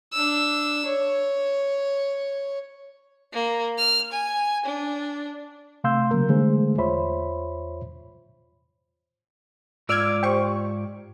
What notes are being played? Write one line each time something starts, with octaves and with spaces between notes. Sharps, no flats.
D4 E6
C#5
A#3
F6
G#5
D4
C3 A3 F5 C6 E6 G6
C#3 F#3 A#3 A#4
D3 E3 G#3 A3 G#4 C5
E2 F4 C5 C#5 E5 B5
G#2 F4 D5 E6 F6 G#6
G4 C5 C#6